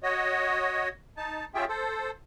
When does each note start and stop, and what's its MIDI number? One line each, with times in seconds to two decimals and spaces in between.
0.03 0.89 66
0.03 0.89 73
0.03 0.89 75
1.17 1.45 63
1.17 1.45 81
1.54 1.65 61
1.54 1.65 65
1.54 1.65 67
1.54 1.65 68
1.54 1.65 76
1.54 1.65 79
1.69 2.11 69
1.69 2.11 72